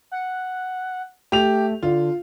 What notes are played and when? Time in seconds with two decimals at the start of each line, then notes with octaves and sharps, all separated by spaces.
0.11 F#5
1.32 A3 G4 F7
1.83 D3 F4